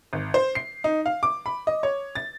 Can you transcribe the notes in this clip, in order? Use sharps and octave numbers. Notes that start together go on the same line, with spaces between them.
G#1
C5
C7
D#4
F5
D6
B5
D#5
C#5
A6